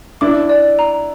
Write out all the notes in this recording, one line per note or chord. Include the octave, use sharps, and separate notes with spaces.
D4 E4 D6
D5
A#5